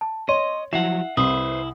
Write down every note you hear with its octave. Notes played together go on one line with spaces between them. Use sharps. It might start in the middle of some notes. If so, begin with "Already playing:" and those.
A5
C#5 D#5 C6
F3 F#3 E4 E5 F#5 C7
C2 E4 B4 C5 D#6